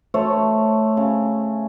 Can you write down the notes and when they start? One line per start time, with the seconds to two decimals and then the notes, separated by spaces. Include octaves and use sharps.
0.14 A3 C5 C#5
0.97 C#3